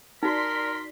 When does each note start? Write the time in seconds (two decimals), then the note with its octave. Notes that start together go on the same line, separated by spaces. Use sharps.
0.23 D#4 F#4 A#4 D5 C6 B6